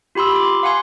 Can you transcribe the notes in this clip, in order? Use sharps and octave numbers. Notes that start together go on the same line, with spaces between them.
F4 G4 B5 C6 E6
B5 D6
C6
F5 F#5 G#5 C6